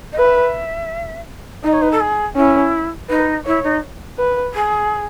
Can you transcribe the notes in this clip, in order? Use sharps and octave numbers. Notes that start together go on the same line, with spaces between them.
D#5
B4 E5
D#4 D#5
C#5
B4
A4
G#4
C#4 E4
D#4 B4
E4 C#5
D#4
B4
G#4